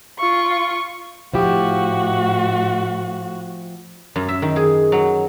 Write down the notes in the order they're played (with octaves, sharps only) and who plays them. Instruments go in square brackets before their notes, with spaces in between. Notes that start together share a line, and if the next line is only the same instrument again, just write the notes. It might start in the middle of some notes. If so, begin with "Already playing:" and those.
[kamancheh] F4 C#6
[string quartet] A2 F#4 [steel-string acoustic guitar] F3 E4 G4
[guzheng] F#2
E5
D#3
G#4
F#3